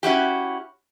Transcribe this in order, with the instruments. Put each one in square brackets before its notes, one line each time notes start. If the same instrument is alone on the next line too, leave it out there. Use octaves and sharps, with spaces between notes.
[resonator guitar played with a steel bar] C#4 E4 F#4 G4